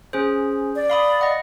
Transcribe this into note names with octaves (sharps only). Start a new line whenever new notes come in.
C#4 G#4 C5
D5
F5 B5 D#6
D#5 F#5